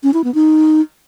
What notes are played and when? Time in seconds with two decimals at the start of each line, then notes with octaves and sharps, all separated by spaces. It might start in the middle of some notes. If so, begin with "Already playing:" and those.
0.03 C#4
0.14 E4
0.24 B3
0.34 D#4